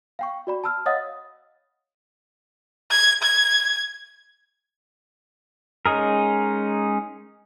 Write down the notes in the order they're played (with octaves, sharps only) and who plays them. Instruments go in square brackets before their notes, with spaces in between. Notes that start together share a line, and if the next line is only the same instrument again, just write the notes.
[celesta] F5 G5 C#6
F#4 D5 B5
A5 B5 E6 F6
C#5 D#5 F5 F#5 D#6 A6
[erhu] G#6
G#6
[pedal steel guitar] G#3 C#4 D#4 G#4 A#4